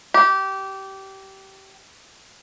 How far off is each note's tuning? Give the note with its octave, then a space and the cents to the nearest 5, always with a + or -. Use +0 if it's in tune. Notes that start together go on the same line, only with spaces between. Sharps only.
G4 -20